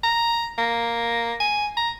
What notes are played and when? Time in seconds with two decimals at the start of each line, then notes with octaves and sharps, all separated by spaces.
0.03 A#5
0.58 A#3
1.40 G#5
1.77 A#5